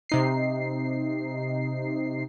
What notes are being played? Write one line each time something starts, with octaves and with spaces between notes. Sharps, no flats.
C3 D#4 C7